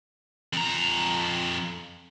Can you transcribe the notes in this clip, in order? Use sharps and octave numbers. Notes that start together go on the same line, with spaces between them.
F2 A#5